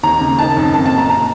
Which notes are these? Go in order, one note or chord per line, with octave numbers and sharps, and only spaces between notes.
D#2 A#5
C#3
D#3 A5
F#2
C4 A5
A5
A#2
A#5
C3 A#5